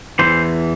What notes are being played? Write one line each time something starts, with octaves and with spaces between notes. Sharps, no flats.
E2 C3 E3 C5